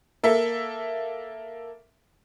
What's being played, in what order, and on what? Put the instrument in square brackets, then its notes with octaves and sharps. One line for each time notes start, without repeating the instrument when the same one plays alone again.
[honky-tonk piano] A#3 A4 E5